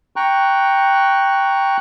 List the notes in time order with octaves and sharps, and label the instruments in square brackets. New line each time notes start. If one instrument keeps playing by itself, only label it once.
[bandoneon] G5 A#5 C#6 F#6